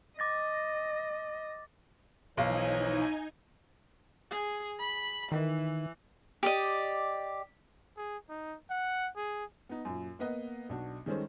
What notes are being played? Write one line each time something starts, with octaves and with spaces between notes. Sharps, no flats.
D#5 D6 A6 A#6
B1 E3 F3 D#4 C#5 F5 G#5
G#4
B5
D#3 E3
G4 D5 D#5
G#4
D#4
F#5
G#4
B3 D#4
F#2 A#2
A#3 B3 B4 D#5 F#5
B1 D4 F#4
D#3 G3 G#3 C#4 A4 C5